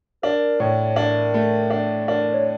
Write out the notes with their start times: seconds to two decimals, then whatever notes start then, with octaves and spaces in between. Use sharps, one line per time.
0.22 D4 A#4
0.60 A2 C#5
0.96 D4 A#4
1.34 A3
1.70 D4
2.08 D4 A#4
2.34 C#5